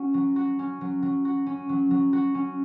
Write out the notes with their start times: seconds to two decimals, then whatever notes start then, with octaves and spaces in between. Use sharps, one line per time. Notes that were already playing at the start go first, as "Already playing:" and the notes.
Already playing: C#4 F#4
0.14 F#3
0.36 F#4
0.59 C#4
0.81 F#3
1.02 F#3
1.25 F#4
1.46 C#4
1.69 F#3
1.91 F#3
2.13 F#4
2.35 C#4